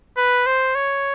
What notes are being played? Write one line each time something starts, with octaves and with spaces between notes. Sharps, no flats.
B4
C5
C#5